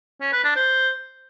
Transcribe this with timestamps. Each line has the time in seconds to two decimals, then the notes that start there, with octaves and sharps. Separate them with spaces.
0.21 C#4
0.32 B4
0.44 D4
0.56 C5